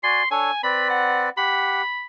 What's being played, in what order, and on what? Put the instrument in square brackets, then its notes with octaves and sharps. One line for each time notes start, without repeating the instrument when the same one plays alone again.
[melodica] F#4 D5 G#5 [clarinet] C6
[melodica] D4 A4 C#5 [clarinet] G#5
[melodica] C4 B4 D5 [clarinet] B5
[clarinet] F#5
[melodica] G4 F#5 [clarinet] B5